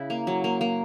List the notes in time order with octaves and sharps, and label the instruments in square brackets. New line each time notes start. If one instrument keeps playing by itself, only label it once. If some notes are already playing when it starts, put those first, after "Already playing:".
Already playing: [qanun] C#3 E4
A#3
F#3
A#3
A#3